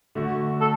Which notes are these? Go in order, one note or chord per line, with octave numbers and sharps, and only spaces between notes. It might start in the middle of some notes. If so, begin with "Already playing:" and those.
D3 A3 F#4
A4